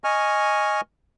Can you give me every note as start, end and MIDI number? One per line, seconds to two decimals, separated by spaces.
0.04 0.81 75
0.04 0.81 80
0.04 0.81 85
0.04 0.81 89